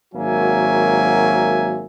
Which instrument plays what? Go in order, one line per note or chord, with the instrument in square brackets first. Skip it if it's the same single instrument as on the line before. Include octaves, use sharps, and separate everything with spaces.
[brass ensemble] G#1 F#3 A#3 F#4 E5 G#5